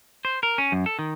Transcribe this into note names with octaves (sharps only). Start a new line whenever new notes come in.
C5
A#4
C#4
F#2
A4
D#3